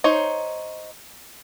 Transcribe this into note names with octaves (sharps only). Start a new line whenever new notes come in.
D#4 C5 C#5